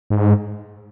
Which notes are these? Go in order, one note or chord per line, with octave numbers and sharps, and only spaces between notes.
G#2